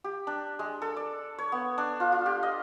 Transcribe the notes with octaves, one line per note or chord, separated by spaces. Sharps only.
G4
D4
G#3
A4
D5
C#5
B3
D4
F4
F4
G4
D#5